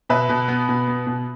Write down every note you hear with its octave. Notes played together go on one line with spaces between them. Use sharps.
B2 B4 E5
B2
B3
B2
B3
B2